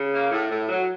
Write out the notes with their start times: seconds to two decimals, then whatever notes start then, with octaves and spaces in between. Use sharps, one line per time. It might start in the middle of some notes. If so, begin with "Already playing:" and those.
Already playing: C#3
0.13 A#3
0.31 A2
0.50 A2
0.69 F#3